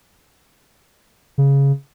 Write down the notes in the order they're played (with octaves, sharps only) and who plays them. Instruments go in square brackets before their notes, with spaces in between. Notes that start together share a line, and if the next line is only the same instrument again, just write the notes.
[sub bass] C#3